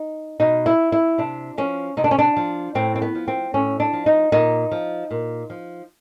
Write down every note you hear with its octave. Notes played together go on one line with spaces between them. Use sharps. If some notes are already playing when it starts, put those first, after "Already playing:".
Already playing: D#4
B2 D#4
E4
E4
C3 D4
F3 C#4
C3 D#4
D4
C#4
D4
F3
A2 C4
C4
B3
F3
C4
A2 C#4
D4
F3
D#4
A#2 D#4
F3
A#2
F3